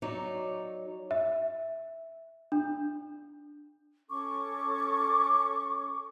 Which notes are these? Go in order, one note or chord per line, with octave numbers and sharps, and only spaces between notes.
F#3 D#4 C#5 D5
E5
D4
C#4 A4 C#6 D6